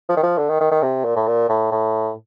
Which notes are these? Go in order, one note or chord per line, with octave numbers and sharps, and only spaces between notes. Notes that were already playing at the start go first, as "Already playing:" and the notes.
F3
D#3
F3
D3
D#3
D#3
D#3
C3
A#2
A2
A#2
A2
A2